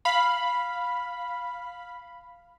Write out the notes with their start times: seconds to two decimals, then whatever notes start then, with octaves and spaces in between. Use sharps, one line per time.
0.05 F5 B5